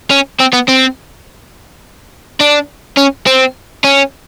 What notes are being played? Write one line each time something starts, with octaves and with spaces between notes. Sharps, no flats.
C#4
C4
B3
C4
D4
C#4
C4
C#4